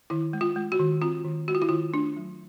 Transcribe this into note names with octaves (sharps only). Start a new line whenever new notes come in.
D#3 E4
G#3
F4
G#3
F#4
D#3
C4 F4
D#3
G#3 F#4
F4
E4
D#3 F4
A3 D4
F#3